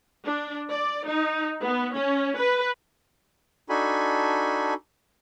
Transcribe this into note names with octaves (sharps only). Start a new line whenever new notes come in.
D4
D5
D#4
B3
C#4
B4
D4 D#4 F#4 A4 G#5 B5